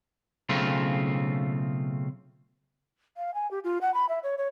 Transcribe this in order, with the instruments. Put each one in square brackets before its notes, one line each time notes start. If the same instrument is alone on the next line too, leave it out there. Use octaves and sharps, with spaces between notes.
[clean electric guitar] B1 C#3 A3 C4 F4
[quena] F5
G#5
G4
F4
F#5
B5
E5
C#5
C#5